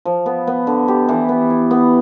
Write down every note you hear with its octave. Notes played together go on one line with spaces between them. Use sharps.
F3
B3
B3
D3
G4
E3
B3
E4
B3